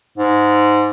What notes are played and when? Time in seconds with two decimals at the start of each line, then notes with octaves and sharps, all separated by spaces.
0.18 G#2